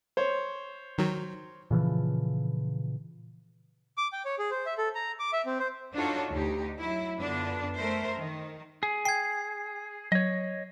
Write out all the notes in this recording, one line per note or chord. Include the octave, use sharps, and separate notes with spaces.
C5 C#5
D#3 F#3
A#2 C#3 E3 F3
D6
G5
C#5
G#4
C5
E5
A4
A#5
D6
E5
C4
C5
D4 D#4 F4 F#4 A4 C#5
D2 D#4 G4
F#3 E4
F#2 D3 B3 D4 F4
A3 A#4 C5 E5
D#3
G#4
G5 G#6 C7
F#3 C#5 D#5